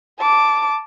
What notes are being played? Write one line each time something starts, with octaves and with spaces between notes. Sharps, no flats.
A5 D6